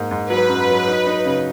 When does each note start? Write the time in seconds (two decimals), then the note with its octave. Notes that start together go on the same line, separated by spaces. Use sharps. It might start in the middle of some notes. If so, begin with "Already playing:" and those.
Already playing: G#2 A#3
0.11 G#2
0.30 F#3 B4
0.49 F#2
0.68 F#3
0.88 D#4
1.07 D#4
1.25 C#3